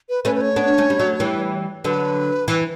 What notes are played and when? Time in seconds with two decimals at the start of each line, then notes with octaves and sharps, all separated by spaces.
0.09 B4
0.25 A3 C#4 B4
0.35 B4
0.41 C#5
0.56 B3 D4
0.78 A3 C#4
0.90 G3
0.99 F#3 A3
1.20 E3 G3
1.84 D3 F#3 B4
2.48 E3